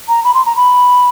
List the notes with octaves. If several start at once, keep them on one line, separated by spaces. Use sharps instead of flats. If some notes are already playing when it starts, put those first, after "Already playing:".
A#5
B5
C6
A#5
B5